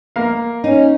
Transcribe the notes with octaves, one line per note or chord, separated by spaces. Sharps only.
A#3 F5
C#4 D#4